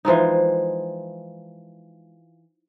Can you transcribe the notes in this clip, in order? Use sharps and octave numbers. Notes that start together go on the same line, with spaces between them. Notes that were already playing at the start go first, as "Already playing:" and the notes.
E3 F3 G#3 D#4